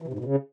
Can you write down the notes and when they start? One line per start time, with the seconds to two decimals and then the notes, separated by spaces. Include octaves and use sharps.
0.02 E3
0.08 C3
0.13 G#2
0.19 B2
0.25 C#3